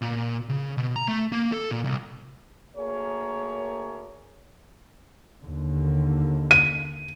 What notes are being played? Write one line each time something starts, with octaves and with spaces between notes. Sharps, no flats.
A#2
C#3
B2
A#5
A3
A#3
A4
A#2
C2
D2 A#3 G#4 A#4 C#5
D#2 D3
D#7